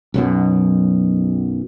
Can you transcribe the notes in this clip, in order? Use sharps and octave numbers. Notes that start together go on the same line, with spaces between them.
B1 F#2 B2